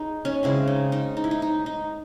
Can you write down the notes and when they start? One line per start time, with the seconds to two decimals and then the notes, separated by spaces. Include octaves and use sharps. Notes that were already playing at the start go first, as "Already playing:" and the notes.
Already playing: D#4 G#4
0.25 C#4
0.43 C#3 G#3 C4 E4
0.68 D#4
0.92 D#4
1.17 D#4
1.24 E4
1.31 D#4
1.42 D#4
1.66 D#4